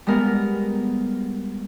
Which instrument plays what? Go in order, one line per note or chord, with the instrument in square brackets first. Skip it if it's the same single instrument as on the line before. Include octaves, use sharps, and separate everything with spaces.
[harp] G3 G#3 B3 A#4